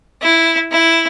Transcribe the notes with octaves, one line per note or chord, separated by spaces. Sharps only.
E4
E4